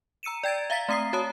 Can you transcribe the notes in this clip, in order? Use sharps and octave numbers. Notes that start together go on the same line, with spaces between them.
A#5 E6 C#7 D#7 E7
D5 G5 G#6 A6 D7
E5 F5 A#5 A6 B6
A3 C4 A#5 D#6 C7
F#4 C#5 A5 D#6